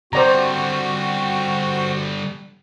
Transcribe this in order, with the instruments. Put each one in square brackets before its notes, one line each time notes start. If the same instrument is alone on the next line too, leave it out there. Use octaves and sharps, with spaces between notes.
[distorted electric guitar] D3 G3 [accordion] C4 F#4 [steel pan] C5 D5 A#5